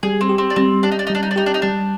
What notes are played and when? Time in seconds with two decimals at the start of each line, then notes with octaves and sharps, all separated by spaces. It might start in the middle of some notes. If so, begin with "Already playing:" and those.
0.03 G3 G#4
0.21 C4
0.29 G4
0.38 C4
0.50 D4
0.56 G3 C4
0.83 D4 G4
0.92 D#4
0.99 D4
1.07 D#4
1.10 G3 D4
1.23 D#4
1.31 D4
1.36 D#4 G4
1.46 D4
1.54 D#4
1.62 G3 D4